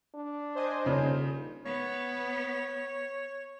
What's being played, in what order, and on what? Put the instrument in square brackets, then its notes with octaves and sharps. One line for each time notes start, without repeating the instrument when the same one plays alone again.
[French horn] D4
[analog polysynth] C5 D#5 G#5
[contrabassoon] D#1 [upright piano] C#3
[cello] B3 [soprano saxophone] C#5